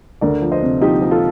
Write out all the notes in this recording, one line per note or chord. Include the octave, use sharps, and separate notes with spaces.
D2 A#4 D5
F3
C5 D#5
C3
F3 D#4 G4
F3
F4 A4